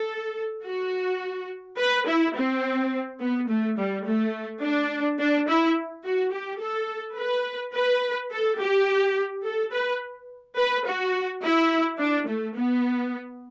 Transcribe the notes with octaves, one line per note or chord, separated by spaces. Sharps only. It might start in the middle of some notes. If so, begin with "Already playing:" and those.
Already playing: A4
F#4
B4
E4
C4
B3
A3
G3
A3
D4
D4
E4
F#4
G4
A4
B4
B4
A4
G4
A4
B4
B4
F#4
E4
D4
A3
B3